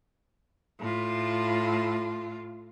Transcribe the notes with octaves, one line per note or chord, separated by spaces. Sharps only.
A2 F4